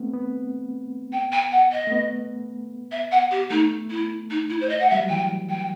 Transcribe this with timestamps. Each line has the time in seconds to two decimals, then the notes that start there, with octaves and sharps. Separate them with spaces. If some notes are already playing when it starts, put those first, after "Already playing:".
Already playing: A3 B3 C4
0.13 B3
1.12 G5
1.32 G5
1.52 F#5
1.72 D#5
1.87 A3
1.92 B3
2.91 E5
3.11 F#5
3.31 G4
3.50 A3 D#4
3.90 E4
4.30 D#4
4.50 E4
4.61 C5
4.69 D#5
4.80 F#5
4.89 E5
4.92 G3
5.00 F#3
5.09 E3 G5
5.49 G5